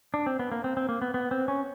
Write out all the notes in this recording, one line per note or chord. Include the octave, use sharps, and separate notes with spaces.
D4
C4
B3
A#3
C4
C4
A#3
B3
B3
C4
C#4